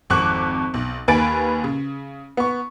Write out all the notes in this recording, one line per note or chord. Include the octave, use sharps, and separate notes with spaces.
G#1 F2 C#6 D6 F#6 F#7
B1
D#2 B4 G#5 B5 A6 D7
C#3
B3 C#6